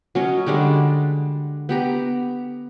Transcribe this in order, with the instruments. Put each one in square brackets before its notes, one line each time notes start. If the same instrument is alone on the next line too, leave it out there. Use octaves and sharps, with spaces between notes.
[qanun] F#3 C#4 D#5
D3 G3 G#3 D4
B3 G4 A#5